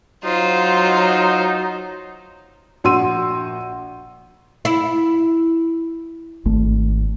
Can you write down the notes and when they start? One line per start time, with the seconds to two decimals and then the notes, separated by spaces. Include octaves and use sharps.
0.24 F#3 D#4 F4 C5
2.84 A#1 F#4 C6 E6 D#7
4.65 E4
6.45 G#1 A3